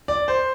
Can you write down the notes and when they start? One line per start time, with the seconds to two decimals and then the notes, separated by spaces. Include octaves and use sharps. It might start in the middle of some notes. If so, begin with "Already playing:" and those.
0.08 D5
0.28 C5